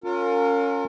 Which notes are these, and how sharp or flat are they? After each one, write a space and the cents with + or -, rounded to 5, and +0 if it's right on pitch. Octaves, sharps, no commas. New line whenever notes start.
C#4 +0 F4 +30 A#4 -35